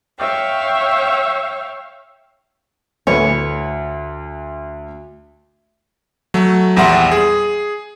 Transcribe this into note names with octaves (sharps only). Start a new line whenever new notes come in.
C#5 E5 F5 G5
D2 A3 B4 C#5 G#5
F#3 A3
A#1 E2 G3 E5 F#5 C6
G#4